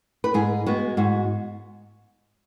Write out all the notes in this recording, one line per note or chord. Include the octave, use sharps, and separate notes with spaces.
B4
G#2 G#4
G#3 B3 F#4
G#2 F#4